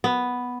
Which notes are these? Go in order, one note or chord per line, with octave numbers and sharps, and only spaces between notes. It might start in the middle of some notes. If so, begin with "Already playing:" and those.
B3